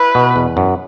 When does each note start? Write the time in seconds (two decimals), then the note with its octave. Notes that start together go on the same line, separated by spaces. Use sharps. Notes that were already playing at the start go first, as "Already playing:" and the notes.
Already playing: E4 B4
0.15 B2
0.36 E2
0.57 F#2